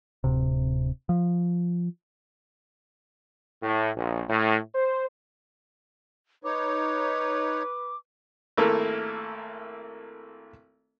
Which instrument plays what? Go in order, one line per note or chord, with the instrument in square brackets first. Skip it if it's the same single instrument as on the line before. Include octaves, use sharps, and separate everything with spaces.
[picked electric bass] D1 C3
F3
[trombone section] A2
A#1
A2
C5
[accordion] D#4 C#5 [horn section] B4 [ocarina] D6
[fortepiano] G#1 A3 A#3 E4 A4 A#4